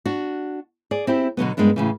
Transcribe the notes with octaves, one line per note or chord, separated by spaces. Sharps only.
D4 F#4
G#4 D5
C4 E4 G4
B2 D3 F#3 B3
G2 G#3 B3 D4 A#4
A2 C#3 E3